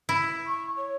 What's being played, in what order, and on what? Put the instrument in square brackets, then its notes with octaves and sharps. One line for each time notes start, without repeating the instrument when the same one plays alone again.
[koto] E4
[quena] C#6
C#5